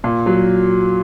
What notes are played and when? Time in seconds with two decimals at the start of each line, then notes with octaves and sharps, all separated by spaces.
0.04 A#2
0.26 F#3